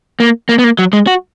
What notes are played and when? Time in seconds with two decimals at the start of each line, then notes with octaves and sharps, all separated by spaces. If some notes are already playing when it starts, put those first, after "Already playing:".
0.20 A#3
0.49 A#3
0.59 B3
0.64 A#3
0.79 F#3
0.93 G#3
1.07 F#4